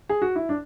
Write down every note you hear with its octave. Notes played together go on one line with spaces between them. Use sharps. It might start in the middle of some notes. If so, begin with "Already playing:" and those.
G#4
F#4
E4
D4